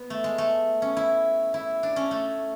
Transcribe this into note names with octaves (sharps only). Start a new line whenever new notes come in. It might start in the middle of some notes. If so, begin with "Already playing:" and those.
Already playing: B3
A3
G#3
A3
C#4
E4
E4
D4
C#4
A3